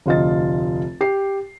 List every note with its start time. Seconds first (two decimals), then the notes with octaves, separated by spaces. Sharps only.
0.06 F1 D2 F4 D#5 A6
1.01 G4 C7